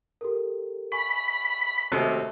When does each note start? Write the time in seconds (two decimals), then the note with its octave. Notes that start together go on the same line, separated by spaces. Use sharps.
0.21 G4 A4 A#4
0.92 G#5 B5 C#6
1.92 D#2 C3 A3 F#4 D#6 E6